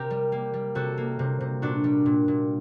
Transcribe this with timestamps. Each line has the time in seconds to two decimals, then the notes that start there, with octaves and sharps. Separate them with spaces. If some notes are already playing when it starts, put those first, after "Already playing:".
Already playing: C3 G4 A#4
0.10 G3
0.32 A#3
0.54 G3
0.75 C3 F#4 A4
0.98 A#3
1.19 C3
1.41 C3
1.62 A#2 D4 F#4
1.84 G3
2.06 A#2
2.28 A#2